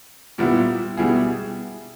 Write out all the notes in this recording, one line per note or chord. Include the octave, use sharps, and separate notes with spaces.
A#2 G3 B3 E4
B2 G3 B3 E4 G#4